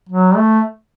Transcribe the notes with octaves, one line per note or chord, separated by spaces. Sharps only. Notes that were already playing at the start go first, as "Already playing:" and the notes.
F#3
A3